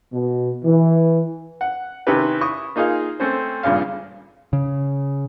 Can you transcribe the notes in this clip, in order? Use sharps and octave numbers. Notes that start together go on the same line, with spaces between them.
B2
E3
F#5
C3 D#3 C#4 E4 G4 B4
E4 C#6 D#6
A#3 D#4 F4 G#4 F5
A3 C4 C#4 C5
G#1 G2 A#2 C#3 F5
C#3